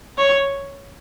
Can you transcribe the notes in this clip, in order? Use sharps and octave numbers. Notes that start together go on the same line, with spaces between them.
C#5